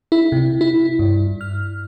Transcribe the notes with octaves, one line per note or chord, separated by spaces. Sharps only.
E4
C3
E4
G2
F6